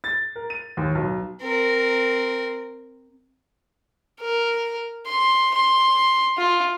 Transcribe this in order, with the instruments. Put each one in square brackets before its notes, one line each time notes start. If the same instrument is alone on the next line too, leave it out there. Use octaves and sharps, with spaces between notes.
[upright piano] A6
A#4
D#7
D#2
B1
[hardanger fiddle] C4 A#4
[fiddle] A#4
C6
C6
F4